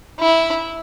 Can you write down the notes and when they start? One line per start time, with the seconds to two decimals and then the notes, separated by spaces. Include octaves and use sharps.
0.19 E4